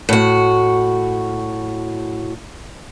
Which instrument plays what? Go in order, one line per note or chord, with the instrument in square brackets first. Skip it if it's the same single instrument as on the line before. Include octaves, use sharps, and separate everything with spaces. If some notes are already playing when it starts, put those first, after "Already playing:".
[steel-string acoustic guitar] A2 F#4